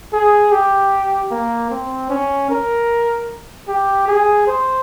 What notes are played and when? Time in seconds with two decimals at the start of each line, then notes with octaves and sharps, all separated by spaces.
0.13 G#4
0.52 G4
1.31 A#3
1.71 C4
2.10 C#4
2.50 A#4
3.68 G4
4.08 G#4
4.48 C5